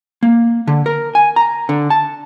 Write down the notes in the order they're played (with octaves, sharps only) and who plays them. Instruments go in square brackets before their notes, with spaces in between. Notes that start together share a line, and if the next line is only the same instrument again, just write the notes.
[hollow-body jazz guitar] A#3
D3
A#4
G#5
A#5
D3
A5